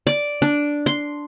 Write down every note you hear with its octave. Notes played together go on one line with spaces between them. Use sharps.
D5
D4
C6